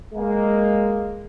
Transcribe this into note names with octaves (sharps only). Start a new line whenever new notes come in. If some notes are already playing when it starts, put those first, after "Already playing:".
G#3 A#3